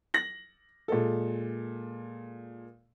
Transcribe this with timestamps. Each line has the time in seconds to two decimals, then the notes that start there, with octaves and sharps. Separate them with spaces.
0.14 A#6 F#7
0.88 A#2 G#3 A4